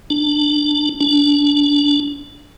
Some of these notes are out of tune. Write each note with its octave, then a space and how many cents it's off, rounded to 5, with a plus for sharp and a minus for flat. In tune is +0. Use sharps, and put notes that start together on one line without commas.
D4 +10
D4 -20